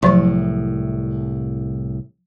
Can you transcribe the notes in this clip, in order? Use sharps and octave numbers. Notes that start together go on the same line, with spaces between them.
C2 A2 F3 F#3 C#6